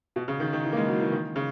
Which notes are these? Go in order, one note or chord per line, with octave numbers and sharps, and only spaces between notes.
B2
C#3
D#3
D#3
E3
A#3
G#3
F#3
E3
D#3
C#3